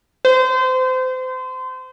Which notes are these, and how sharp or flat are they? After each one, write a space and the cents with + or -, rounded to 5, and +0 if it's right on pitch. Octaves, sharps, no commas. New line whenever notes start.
C5 -30